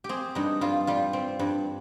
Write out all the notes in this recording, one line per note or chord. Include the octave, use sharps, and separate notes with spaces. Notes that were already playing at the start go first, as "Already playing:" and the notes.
G4
C4 G#4
G2 D#4
G2 F4
G3 F4
C4
G2